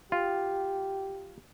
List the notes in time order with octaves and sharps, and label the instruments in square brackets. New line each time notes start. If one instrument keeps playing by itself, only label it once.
[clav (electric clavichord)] F4 [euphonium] G4